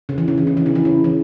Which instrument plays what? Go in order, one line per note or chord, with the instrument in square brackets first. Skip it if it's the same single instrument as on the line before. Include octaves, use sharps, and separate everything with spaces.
[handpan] C#3
E3
C#3
E3
C#3
E3
C#3
E3
C#3
E3